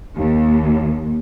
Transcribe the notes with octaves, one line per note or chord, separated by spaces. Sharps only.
D#2